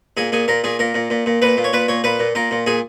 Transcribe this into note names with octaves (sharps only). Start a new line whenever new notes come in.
A#2 G#4
A#2 G#4
A#2 A#4
A#2 G#4
A#2 A#4
A#2
A#2
A#2
A#2 B4
A#2
C#5
A#2 B4
A#2 C#5
A#2 B4
A#2
A#2 A#4
A#2
A#2 G#4